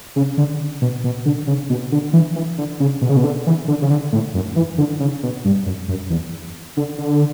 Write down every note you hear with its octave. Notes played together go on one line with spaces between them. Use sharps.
C#3
D3
B2
B2
D3
C#3
B2
D3
E3
E3
D3
C#3
B2
C#3
B2
D3
E3
D3
C#3
D3
A2
F#2
E3
D3
C#3
B2
G2
F#2
F#2
E2
D3
D3